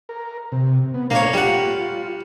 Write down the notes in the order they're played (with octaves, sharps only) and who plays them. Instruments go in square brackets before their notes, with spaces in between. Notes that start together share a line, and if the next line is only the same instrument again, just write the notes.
[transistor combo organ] A#4
C3
B3
[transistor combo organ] A#2 A3 D4 [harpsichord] A#3 C#5
[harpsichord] G3 F#5 [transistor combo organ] F4